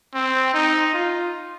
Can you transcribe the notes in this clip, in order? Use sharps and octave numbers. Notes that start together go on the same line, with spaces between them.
C4
D#4
F4